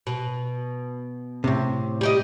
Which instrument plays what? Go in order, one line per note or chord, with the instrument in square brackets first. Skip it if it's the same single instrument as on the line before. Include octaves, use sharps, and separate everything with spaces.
[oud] B2
[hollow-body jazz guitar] A2 C3
[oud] G3 G4 D#5